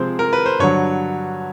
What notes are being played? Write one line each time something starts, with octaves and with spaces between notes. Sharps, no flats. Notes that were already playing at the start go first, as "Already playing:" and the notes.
Already playing: C3 F3 G#3 C4 C5
A#4
B4
C5
G2 D3 F#3 C#5